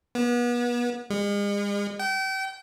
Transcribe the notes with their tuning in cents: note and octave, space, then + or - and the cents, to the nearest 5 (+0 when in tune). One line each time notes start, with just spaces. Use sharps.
B3 -35
G#3 -40
G5 -35